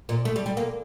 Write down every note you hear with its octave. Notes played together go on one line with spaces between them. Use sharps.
A#2
A3
G3
G3
A#3